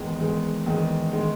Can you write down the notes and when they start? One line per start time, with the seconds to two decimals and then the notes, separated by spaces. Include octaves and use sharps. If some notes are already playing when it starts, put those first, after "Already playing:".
Already playing: E2 D#3 G#3
0.19 E2 D#3 G#3
0.66 E2 D#3 G#3
1.13 D#3 G#3